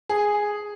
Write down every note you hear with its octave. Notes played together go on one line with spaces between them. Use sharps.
G#4